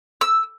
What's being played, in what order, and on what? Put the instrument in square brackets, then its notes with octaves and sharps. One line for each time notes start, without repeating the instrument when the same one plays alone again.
[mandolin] E6